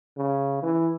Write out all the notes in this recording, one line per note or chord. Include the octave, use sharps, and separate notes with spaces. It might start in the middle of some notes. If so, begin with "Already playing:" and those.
C#3
E3